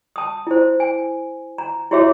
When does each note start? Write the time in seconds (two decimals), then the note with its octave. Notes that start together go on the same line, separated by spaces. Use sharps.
0.16 A5 D#6
0.47 E4 C5
0.80 G#5
1.58 A#5
1.91 E4 F#4 G4 C#5 E5 D6